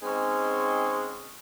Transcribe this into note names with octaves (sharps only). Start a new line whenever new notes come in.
G#3 C4 C#4 D#4 G#4